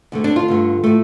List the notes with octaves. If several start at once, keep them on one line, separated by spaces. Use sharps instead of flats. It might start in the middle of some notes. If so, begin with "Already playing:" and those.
D2 D3 A3
D4
F4
G2 D3 A3
A2 A3